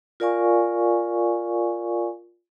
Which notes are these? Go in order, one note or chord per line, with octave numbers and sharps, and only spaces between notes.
F4 A#4 D5 F5 G#5 C#6